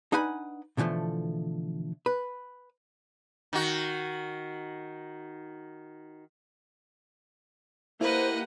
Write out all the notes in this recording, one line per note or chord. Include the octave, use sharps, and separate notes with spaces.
D4 D#4 B4 F#5 G#5 B5
B2 D3 E3 F3 A3
B4
D#3 F#4
A#3 E4 G4 B4 C5 D#5 F#5